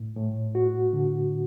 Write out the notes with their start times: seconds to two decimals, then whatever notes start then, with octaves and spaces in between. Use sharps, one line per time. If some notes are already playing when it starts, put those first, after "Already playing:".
Already playing: A2
0.17 A2
0.55 F#4
0.93 D3